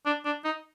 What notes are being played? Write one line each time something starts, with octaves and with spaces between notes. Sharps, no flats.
D4
D4
D#4